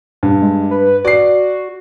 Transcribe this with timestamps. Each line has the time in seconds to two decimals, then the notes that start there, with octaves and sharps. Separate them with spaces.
0.23 G2
0.42 G#3
0.71 B4
1.05 F#4 D5 C7